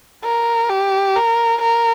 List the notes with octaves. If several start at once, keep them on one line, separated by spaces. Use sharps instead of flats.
A#4
G4
A#4
A#4